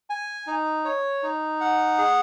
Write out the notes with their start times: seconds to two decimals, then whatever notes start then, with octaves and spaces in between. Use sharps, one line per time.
0.10 G#5
0.47 D#4
0.85 C#5
1.23 D#4
1.61 F#5
1.98 G#4